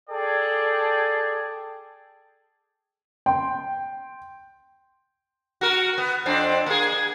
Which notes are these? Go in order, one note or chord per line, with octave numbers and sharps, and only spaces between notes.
G#4 A4 D5 G5 A5
G5 C6
F#4 A#4
B3
F2 C4 D4
A#3 G#4